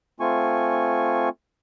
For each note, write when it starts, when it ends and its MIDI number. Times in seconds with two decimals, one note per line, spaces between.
0.20 1.29 57
0.20 1.29 60
0.20 1.29 65
0.20 1.29 80
0.20 1.29 85